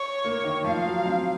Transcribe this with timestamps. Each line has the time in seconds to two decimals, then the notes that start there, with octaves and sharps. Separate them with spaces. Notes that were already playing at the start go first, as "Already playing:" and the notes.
Already playing: C#5
0.24 A#3
0.44 D#3
0.64 F3 F5
0.86 F#3
1.06 C4